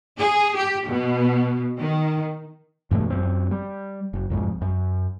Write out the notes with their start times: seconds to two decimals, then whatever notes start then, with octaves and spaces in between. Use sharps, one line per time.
0.19 G#4
0.56 G4
0.88 B2
1.80 D#3
2.91 E2 G2 B2 A3
3.10 F#2 C4
3.51 G3
4.13 F#1
4.30 C2 F2 G#2
4.62 F#2